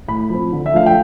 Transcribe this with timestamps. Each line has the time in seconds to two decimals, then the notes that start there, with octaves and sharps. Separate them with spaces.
0.08 A2 B5
0.30 F3 C4
0.52 D3
0.66 E5
0.74 F3 A3 D4 F5
0.86 G5